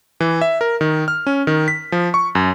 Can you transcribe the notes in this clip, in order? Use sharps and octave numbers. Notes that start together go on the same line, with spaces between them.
E3
E5
A#4
D#3
F6
C#4
D#3
B6
F3
C#6
F#2